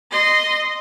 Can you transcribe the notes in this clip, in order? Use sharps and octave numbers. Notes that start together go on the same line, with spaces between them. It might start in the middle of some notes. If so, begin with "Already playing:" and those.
D#5 C6